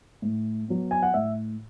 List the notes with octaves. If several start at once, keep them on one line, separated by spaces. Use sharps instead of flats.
A2
F#3 B3
G#5
F#5
A2 E5